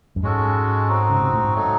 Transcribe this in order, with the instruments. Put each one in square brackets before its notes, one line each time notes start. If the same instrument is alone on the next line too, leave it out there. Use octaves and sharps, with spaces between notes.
[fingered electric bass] F#2
[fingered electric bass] G#2 [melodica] G#3 C#4 F#4 A4
[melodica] C4 D#4 F#4
[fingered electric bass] C#3
C3
A2
G#2
[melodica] F#3 A3 D#4